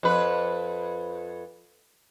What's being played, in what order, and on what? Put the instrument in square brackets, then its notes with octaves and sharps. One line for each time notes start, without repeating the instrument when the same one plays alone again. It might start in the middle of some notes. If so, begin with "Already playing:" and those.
[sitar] F2 B4